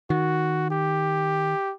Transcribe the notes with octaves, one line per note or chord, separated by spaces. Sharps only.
D#3 F#4
G4